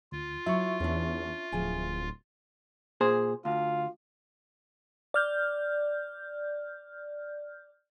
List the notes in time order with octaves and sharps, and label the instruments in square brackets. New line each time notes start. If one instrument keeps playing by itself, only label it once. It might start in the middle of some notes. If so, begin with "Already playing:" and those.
[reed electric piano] D2 [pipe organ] F4
[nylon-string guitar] F#3 E4 [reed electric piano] E5 C#6
[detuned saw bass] E2 [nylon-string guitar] C#4 D4
[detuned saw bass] D1 [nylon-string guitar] F3 G#4 G#5
[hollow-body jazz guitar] A#2 G#4 C5
[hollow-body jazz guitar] D2 [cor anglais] F4
[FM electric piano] D5 F6 G6